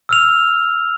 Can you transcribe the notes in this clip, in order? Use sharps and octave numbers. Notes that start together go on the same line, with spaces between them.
E6 F6 F7